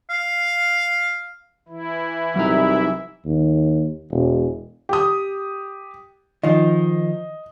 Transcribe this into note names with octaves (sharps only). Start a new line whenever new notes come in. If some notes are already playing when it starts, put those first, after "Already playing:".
F5
E3 E4
C2 F#3 D#4 E5 A#5
D#2
E1
G4 D#6
D#3 F3 D#5